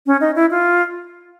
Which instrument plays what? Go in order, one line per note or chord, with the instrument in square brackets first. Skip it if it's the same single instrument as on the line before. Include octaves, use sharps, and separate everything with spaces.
[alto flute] C#4
D#4
E4
F4